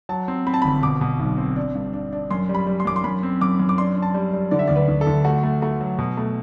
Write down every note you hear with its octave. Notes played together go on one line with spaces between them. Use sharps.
F#3 A5
C4
C4 B5
A5
B5
G1
B2 D6
B2
B1
C4
D4
G2
D4
D4
F#2 C6
G3
B5
G3
C6
F#2 D6
C6
F#2 B5
C4
F#2 D6
F#2
D6
D4 C6
D4
A5
G3
G3
D3 D5
E5
D2 D5
B4
D2
A4
D2
A3 F#4
A3
A3 F#4
F#3
B2
A3